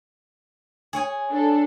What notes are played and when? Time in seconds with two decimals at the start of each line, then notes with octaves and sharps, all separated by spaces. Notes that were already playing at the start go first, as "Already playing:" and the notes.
0.93 G#4 C#5 G#5
1.31 D4 A4